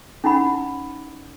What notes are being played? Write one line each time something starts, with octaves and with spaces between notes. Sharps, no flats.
C#4 D#4 E4 F#5 B5